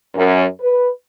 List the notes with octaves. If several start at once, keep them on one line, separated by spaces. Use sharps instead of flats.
F#2
B4